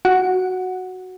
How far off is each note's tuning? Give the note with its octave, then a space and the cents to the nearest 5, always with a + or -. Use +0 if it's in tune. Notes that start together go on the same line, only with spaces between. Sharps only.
F#4 +0 F#5 -5